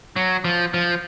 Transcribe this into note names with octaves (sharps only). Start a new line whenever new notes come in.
F#3
F3
F3